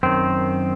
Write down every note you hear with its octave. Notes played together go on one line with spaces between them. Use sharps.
F#2 D#3 C4